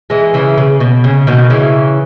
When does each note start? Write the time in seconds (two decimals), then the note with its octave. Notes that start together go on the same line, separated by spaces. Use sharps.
0.10 E3 G#3
0.34 C#3 E3
0.58 C#3
0.80 B2
1.04 C#3
1.27 B2 D#3
1.50 C#3 E3